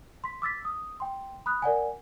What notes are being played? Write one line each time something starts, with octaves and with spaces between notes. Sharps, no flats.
C6 B6
D6 E6 A6 B6
D#6 E6
G5 C6
B5 D#6 F#6
A#4 D5 F#5 G#5